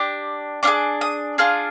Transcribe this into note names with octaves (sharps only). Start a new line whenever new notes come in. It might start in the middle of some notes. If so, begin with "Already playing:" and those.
Already playing: D4 G4
D4 F4 G#4 D6
D#6
D4 F4 G#4 F6